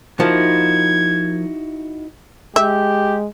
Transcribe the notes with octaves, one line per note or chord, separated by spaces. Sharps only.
F3 A#3 D#4 E4 F#4 G#6
G#3 G4 E5